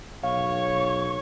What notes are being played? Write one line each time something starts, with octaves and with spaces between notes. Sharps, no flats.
B1 C#5 F5 C#6